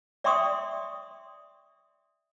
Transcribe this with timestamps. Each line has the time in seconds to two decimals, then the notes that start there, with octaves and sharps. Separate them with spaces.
0.24 D5 E5 G5 C6 C#6 D#6